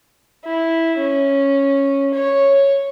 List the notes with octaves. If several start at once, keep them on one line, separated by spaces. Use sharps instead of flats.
E4
C#4
C#5